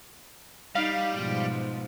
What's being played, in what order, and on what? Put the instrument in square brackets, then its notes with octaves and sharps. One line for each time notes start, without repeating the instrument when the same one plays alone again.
[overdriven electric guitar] G3 [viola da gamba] D#4 [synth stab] F5
[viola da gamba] G#2 B2 F3